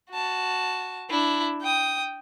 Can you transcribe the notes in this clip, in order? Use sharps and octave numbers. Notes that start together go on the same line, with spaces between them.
F#4 A5
D4 E4
G5 D#6